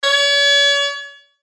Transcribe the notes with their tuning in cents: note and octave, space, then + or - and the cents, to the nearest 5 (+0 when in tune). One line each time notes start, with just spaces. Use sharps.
C#5 +40